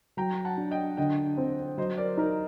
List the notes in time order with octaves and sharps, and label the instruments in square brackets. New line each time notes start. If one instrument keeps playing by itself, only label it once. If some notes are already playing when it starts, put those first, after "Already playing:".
[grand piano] F#3 [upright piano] G5 A#5
[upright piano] F#5 A5
[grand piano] D4
[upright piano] D#5 G5
[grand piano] D3 [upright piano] D#5 G5
[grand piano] C4
[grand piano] F#3 [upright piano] C5 D#5
[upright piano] A#4 D5
[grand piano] D#4 [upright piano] A#4